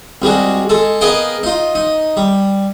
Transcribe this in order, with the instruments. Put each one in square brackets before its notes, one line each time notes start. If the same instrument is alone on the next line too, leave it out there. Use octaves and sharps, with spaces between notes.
[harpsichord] C2 G3 G#3 F#4
G#3 A4
B3 G#4 A#4 D#5 F5 G5
D#4 F4
D#4
G3